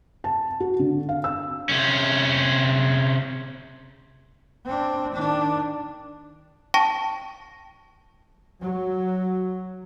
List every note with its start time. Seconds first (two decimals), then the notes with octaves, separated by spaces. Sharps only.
0.24 A5
0.60 F#4
0.79 D3
1.09 F5
1.24 E6
1.69 C3 C#4
4.66 C4 D4
5.14 D#3 D4
6.74 G5 A5 C#6 A#6
8.61 F#3